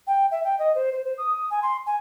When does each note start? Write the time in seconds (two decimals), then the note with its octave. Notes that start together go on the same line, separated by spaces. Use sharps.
0.07 G5
0.31 E5
0.44 G5
0.59 D#5
0.75 C5
0.92 C5
1.04 C5
1.18 D#6
1.50 G#5
1.62 C6
1.86 G#5